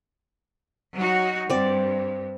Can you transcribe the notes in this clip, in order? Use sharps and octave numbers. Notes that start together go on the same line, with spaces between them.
F#3 D#4 F#4
G2 C4 D5